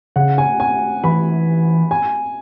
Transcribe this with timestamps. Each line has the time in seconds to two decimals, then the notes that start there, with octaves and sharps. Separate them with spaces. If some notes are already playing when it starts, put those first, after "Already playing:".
0.16 C#3 F#5
0.38 G#5
0.60 G#5
1.04 E3 B5
1.91 G#5